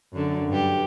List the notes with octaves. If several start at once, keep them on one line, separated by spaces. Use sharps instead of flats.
F#2 D3
G2 G4